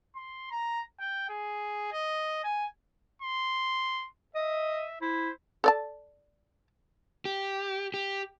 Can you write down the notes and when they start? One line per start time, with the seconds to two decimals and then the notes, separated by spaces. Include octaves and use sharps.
0.16 C6
0.51 A#5
1.00 G5
1.29 G#4
1.92 D#5
2.44 G#5
3.22 C6
4.35 D#5 E5
5.01 E4 C5
5.64 A4 D5 A5
7.25 G4
7.94 G4